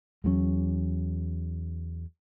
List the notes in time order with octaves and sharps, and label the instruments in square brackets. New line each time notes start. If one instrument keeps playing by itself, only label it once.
[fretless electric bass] E2 F#3 A#3 C#4